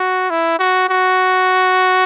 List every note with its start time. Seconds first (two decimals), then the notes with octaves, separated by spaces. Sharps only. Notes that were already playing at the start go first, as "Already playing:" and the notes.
Already playing: F#4
0.30 E4
0.59 F#4
0.89 F#4